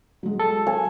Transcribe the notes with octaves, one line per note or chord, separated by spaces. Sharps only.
F#3 G#3
A4
G#5